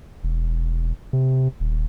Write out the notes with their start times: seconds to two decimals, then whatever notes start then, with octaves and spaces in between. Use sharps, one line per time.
0.23 E1
1.13 C3
1.60 D#1